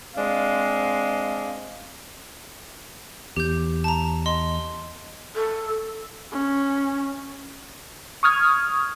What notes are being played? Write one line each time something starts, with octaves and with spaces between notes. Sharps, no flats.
G#3 C4 D4 F5
E2 G4 G6
A5 A#5
D#5 C6
A4
C#4
C#6 D#6 F6 G#6